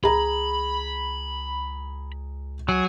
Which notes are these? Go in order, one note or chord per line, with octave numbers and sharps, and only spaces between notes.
C#2 G#4 A#5 B5
F#3 G#4